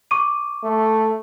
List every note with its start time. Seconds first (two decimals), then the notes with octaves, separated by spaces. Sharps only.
0.11 C#6 D6 D#7
0.63 A3